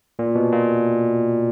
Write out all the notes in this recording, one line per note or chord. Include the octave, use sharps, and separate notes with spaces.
A#2
B2
A#2